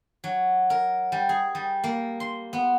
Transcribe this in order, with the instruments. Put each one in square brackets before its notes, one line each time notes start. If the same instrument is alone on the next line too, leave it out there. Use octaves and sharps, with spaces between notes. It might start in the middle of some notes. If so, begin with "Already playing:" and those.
[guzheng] F#3
A#4
G3
G#4
G3
A#3
C6
B3